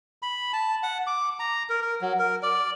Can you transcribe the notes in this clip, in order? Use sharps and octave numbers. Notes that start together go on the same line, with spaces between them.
B5
A5
F#5
D6
A#5
A#4
A#4
F#3
A#4
D5